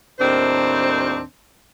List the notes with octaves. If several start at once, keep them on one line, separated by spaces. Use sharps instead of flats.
D#2 A2 D#3 C4 D4 C5